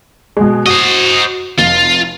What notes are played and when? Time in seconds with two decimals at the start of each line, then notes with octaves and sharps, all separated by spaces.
0.37 B2 G#3
0.66 F#4 C5 D#5
1.58 F1 F4